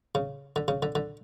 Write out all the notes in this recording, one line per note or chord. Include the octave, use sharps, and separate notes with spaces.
C#3
D3
C#3
D3
D3